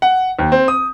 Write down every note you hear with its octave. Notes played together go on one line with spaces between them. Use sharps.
F#5
D#2
C4
D#6